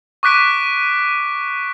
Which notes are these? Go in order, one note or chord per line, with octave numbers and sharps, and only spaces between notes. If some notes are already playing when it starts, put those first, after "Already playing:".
C#6 D6 F#6 B6 D7 D#7